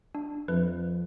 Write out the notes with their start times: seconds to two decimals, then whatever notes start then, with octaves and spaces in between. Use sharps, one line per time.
0.15 D4
0.48 F2 F3 B4